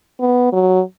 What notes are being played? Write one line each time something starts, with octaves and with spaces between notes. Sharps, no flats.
B3
F#3